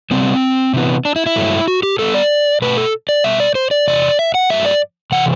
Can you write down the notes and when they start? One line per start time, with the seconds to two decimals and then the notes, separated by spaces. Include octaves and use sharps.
0.11 C3 G3 B3 C4
0.74 C3 E3 B3
1.05 D4
1.16 E4
1.26 E4
1.36 G2 F#3 A3
1.68 F#4
1.83 G4
1.99 A2 G3 B3 A4
2.14 D5
2.62 B2 A3 B4
2.77 A4
3.09 D5
3.24 B2 G3 B3 E5
3.40 D5
3.55 C5
3.71 D5
3.88 E2 C3 D5
4.19 E5
4.34 F#5
4.50 G2 F#3 A3 E5
4.65 D5
5.12 C3 E3 F#5